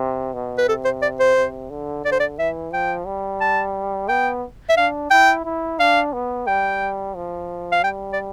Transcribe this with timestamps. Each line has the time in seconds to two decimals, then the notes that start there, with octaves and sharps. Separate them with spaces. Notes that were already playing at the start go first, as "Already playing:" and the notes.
Already playing: C3
0.34 B2
0.58 B4
0.68 C3 A4
0.85 C5
1.02 D5
1.20 C5
1.36 C3
1.70 D3
2.05 D3 D5
2.12 C5
2.20 D5
2.38 E3 E5
2.73 F3 G5
3.06 G3
3.41 A5
4.09 B3 G5
4.69 E5
4.77 D4 F5
5.11 E4 G5
5.45 E4
5.79 D4 F5
6.13 B3
6.47 G3 G5
7.16 F3
7.72 F5
7.84 G3 G5
8.13 D5